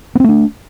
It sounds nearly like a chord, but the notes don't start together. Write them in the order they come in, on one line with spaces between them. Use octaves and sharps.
B3 C4 A3 D4